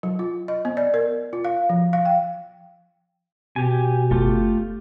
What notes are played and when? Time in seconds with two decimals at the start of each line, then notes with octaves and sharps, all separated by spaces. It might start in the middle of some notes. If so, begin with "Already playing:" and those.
0.03 F#3
0.19 F4
0.48 D#5
0.65 B3
0.77 D5
0.94 A#4
1.33 F4
1.45 F5
1.69 F3
1.93 F5
2.06 G5
3.56 B2 G4 G#5
4.11 F#1 A3 F4 G4